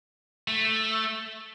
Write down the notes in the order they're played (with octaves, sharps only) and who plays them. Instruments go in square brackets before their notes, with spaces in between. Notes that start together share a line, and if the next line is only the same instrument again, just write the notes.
[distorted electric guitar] A3